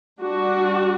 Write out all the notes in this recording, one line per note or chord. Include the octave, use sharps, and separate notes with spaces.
G3 D4 F#4